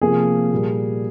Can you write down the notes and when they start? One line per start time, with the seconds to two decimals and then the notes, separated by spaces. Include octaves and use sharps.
0.02 C3 F3 A#3 G#4
0.52 A#2 G3 A#3